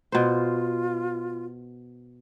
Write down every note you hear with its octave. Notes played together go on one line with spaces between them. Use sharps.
B2 F4 C5